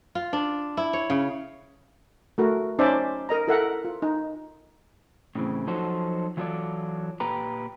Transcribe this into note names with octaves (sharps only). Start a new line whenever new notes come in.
F4
D4
E4
C#5
C#3
A3 F#4 A#4
C#4 D#4 C5 D5 E5 A5
A#4 D#5 A#5
E4 A4 A#4 E5 F#5
F4
D#4
A2 C#3 E3 C4
F3 F#3 D#4 F#4 A4 C5
E3 F#3 F4 A4 C#5 D5
A#2 G4 B4 A#5